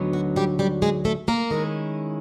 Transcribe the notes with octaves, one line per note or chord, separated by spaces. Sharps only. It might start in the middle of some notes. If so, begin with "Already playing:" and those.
Already playing: D2 D3 F#3 B3 D#4
F#4
G3 G4
G3 G4
G#3 G#4
A3 A4
A#3 A#4
D#3 G#3 C#4 E4